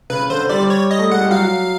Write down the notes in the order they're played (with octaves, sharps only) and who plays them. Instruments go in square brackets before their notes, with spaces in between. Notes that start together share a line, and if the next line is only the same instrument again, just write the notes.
[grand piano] C#3 [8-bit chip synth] B4
[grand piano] D3 [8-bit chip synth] C5
[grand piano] G3 [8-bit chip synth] D5
[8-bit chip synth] C#5
D#5
[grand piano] A3
[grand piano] G#3 [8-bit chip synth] F#5
[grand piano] G3
[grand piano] F#3 [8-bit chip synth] F5